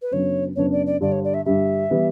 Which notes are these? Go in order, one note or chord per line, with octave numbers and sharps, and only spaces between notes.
B4
F#2 C#3 F#3 B3 D4 C#5
F#2 C#3 F#3 B3 D4 C#5
D5
D5
G2 D3 G3 D5
C#5
D5
E5
G2 D3 G3 E5
E3 G3 B3